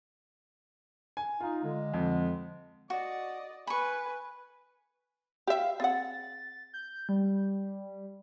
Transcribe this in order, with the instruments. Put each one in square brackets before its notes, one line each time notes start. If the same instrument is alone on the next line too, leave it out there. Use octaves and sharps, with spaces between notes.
[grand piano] G#5
[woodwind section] D#4 [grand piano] F4
[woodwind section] D3 G#3
[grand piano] F2
[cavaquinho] F#4 [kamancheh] D5 D#5
[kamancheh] B4 G#5 [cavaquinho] B5 C#6
[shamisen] G4 E5 [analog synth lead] F5
[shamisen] C4 G#4 F#5 [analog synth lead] A6
[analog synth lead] G6
G3